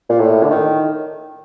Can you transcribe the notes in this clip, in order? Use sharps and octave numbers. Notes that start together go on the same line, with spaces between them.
A#2
A2
D3
D#3